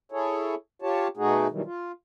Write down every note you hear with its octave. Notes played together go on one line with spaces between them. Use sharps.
E4 G#4 A4 C#5
F4 G4 C#5 A5
B2 A3 D#4 F#4 G#4
B2 D#3 E3 F#3 G3
F4